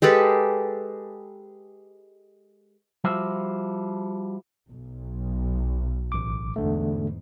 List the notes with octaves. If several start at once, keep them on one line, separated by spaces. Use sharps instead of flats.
G#3 G4 A4 B4
F3 G3 F4 F#4 C5 E5
B1
A1 D6
E2 G#2 D3 A3